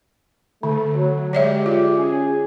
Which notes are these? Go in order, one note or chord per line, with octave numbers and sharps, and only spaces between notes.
D3 A3
F#3
G#3 G4 C#5 D5 E5
F4
C#4 G#4